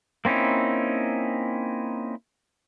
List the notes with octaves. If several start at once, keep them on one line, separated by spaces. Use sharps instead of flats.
A#3 C4 C#4 D#4 E4